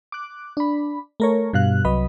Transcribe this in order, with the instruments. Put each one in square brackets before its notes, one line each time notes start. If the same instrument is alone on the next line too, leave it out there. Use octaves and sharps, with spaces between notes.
[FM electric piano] D6 F#6
D4 B5
A3 A#4 C#5
G2 B2 F5 F#6
C2 F#3 B4 D#5 B5